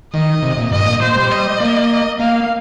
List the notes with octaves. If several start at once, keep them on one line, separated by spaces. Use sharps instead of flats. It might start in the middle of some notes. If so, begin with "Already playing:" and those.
D#3 D#5
C3
A#2
G2 D#5
A#2
A#2 C5
G3
D#5
A#3
A#3 F5